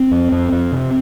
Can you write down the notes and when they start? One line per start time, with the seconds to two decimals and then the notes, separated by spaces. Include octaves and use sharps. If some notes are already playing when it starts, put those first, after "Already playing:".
Already playing: C4
0.11 F2
0.32 F2
0.52 F2
0.72 C3